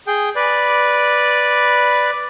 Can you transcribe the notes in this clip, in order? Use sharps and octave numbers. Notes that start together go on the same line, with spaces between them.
G#4 G5
B4 D5